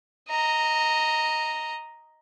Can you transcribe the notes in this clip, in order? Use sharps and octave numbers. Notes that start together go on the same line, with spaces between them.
D#5 A#5